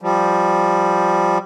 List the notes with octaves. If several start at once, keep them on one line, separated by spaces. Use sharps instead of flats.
F3 G3